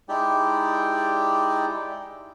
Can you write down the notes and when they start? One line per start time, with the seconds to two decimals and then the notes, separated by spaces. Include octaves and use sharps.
0.09 G#3 D#4 E4 G4 D5 G5